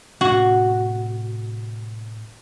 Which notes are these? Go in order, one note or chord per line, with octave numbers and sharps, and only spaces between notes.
A2 C3 F#4